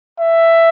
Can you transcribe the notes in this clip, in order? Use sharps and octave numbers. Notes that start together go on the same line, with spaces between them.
E5